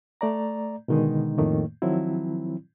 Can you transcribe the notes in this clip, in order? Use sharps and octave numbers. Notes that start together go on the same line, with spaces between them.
A3 D5 A#5
B2 D3 D#3 G#3 D#4
F2 A2 D#3 A3 A#3
D#3 F3 F#3 C4 E4